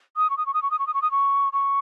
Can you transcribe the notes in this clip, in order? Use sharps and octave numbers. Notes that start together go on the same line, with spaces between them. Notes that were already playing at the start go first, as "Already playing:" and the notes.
D#6
C#6
D#6
C#6
D#6
C#6
D#6
C#6
D#6
C#6
D#6
C#6
C#6